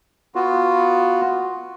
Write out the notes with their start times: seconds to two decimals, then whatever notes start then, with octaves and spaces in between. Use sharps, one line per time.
0.35 B3 F4 F#4